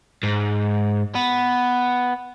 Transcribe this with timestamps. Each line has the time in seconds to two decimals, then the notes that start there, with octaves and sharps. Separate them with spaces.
0.23 G#2
1.15 B3